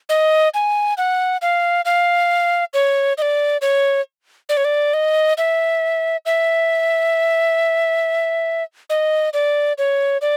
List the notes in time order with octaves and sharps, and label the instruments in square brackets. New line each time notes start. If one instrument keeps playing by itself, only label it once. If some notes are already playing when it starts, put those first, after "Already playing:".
[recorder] D#5
G#5
F#5
F5
F5
C#5
D#5
D5
C#5
D5
C#5
D5
D#5
E5
E5
D#5
D5
C#5
D5